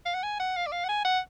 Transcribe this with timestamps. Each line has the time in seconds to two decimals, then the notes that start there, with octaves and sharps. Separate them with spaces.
0.06 F5
0.14 F#5
0.23 G#5
0.39 F#5
0.57 F5
0.67 D5
0.72 F5
0.84 F#5
0.89 G#5
1.05 F#5